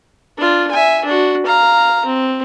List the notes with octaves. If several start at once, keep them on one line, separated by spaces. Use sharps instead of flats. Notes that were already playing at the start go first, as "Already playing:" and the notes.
D4 F4
E5 G#5
D4 F#4
F5 A#5
C4